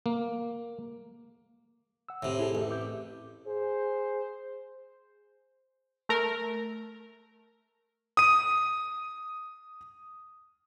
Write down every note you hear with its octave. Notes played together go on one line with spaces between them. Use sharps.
A#3
F#5 E6
A2 C3
E4 G#4 A4
A1
E5 D6 G6
G#4 C5
A3 A#4
D#6 D#7